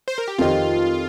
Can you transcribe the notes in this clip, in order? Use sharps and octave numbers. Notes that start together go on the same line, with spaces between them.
C5
A#4
G4
F2 D#3 C4 F4 G4 D#5